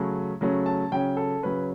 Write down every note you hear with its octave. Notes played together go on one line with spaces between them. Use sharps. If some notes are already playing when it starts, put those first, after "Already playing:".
Already playing: C#3 F#3 A3 C#4
C#3 F#3 A3 C#4
A5
C#3 F#3 C#4 G5
A4
C#3 F#3 C#4 B4